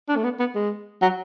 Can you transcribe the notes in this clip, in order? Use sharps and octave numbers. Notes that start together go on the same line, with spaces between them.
D4
A3
B3
B3
G#3
F#3